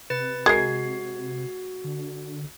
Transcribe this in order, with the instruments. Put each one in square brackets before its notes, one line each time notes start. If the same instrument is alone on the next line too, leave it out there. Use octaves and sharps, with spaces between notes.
[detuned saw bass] C3 [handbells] B4 A6
[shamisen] G#3 A#4 [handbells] F#4 [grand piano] G#6 C7
[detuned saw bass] D3